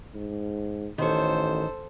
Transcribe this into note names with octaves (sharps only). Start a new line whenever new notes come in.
G#2
A1 D#3 A4 C5 C#5